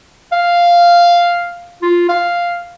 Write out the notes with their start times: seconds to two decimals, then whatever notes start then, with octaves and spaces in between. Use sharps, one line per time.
0.32 F5
1.82 F4
2.09 F5